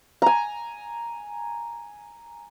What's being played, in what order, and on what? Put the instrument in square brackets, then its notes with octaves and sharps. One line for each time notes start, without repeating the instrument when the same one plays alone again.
[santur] G#5 A#5